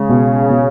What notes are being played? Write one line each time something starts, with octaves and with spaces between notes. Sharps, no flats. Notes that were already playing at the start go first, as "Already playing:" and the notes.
Already playing: C#3 G#3
B2
B2